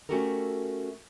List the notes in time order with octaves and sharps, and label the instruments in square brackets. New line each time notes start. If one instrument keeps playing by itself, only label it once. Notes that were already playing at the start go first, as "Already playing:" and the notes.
[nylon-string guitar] A3 C#4 F#4 G4 A4 A#4